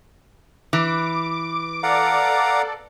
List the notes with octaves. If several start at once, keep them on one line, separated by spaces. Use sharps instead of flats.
E3 D6
A4 D5 F5 F#5 A#5